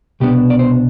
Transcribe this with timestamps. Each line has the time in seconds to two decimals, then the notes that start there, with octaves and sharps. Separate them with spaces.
0.20 C2 B2 B3 D4 G4
0.50 D5
0.59 C5